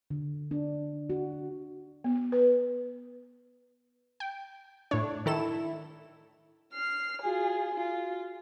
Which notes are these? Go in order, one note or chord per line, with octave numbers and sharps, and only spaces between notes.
D3
D4
F#4
B3
B4
G5
A2 D4 C#5
D#3 E4 A4 E7
F6 C7
F4 F#4 G#4 G#5
F4